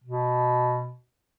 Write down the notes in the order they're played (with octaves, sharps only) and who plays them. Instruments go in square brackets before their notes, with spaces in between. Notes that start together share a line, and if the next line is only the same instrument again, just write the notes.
[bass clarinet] B2